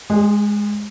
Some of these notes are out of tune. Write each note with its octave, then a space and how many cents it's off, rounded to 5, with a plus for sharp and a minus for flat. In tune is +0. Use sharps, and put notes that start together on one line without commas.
G#3 +0 G#4 -40